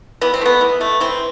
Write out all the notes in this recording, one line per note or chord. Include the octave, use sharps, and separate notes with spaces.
E3 B3
C4
A3 B3
E3
A3
E3 C4